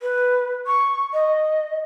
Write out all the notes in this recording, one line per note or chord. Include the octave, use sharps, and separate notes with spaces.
B4
C#6
D#5